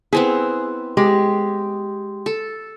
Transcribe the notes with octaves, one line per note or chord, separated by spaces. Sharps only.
B3 C4 E4 G#4
G#3 G4
A4